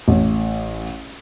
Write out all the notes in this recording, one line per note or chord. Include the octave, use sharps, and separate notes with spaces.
A1